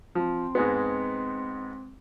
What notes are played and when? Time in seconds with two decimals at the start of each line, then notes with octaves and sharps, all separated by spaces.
0.15 F3 C4
0.55 G#2 G#3 B3